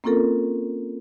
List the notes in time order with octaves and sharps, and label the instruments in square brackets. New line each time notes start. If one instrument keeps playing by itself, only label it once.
[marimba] A#3 C4 C#4 F4 A4 A#4